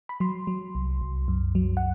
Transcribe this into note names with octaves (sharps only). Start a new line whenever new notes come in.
B5
F#3 C6
F#3
C2
C2
F#2
F#3
F#5